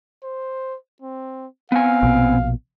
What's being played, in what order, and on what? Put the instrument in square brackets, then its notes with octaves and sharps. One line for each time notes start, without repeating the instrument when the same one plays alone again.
[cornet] C5
C4
[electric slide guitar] B3 C4 G#5 [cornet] F5
[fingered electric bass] A#1 B2